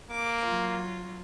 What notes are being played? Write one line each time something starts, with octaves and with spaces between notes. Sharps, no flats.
A#3 D6
F#3 F4